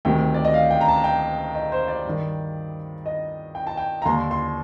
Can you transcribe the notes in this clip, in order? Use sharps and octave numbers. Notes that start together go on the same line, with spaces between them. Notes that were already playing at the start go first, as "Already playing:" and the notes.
D2 C3 D#3 G5
D5
D#5
F5
G5
A#5
A5
G5
D#5
C5
D5
G2 D#3
D#5
G5
A5
G5
A#5
D#2 D3 C6
C6